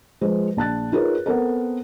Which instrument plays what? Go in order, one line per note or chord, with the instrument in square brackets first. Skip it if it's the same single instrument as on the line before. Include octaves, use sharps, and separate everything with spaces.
[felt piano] F3 G#3 B4 C5
A#1 A5 F#6 A6
D#4 F4 G#4 A#4 B4 C#5
B3 C4 A4 A#4